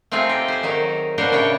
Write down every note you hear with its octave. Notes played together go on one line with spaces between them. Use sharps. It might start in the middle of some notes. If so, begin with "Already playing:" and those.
A3 C4 D#4 F4 G#4
G4
G#4 C5
D#3 F#3 D#4
B2 D4 F4 F#4 A#4 C5
A2 C#3 C#5 G5